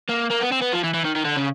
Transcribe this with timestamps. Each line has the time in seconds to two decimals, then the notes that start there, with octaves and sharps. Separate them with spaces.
0.09 A#3
0.30 A#3
0.40 B3
0.51 C4
0.61 B3
0.73 F3
0.84 E3
0.94 E3
1.05 D#3
1.16 D#3
1.25 D3
1.37 C#3